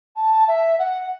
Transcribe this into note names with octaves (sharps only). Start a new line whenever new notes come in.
A5
E5
F#5